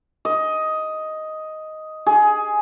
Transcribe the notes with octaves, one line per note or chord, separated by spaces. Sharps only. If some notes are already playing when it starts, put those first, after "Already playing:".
D#5
G#4